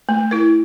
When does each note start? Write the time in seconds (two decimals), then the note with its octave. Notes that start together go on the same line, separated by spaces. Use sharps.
0.09 A3
0.31 E4 A#4